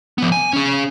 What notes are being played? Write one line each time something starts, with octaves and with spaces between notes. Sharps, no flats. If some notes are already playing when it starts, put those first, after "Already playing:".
F3 B3
G#5
C#4 G#4